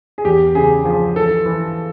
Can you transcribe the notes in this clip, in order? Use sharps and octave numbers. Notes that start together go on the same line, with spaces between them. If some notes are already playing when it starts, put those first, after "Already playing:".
G#4
E2 G4
C#3 G#4
F3 G#4
E3 A4
E3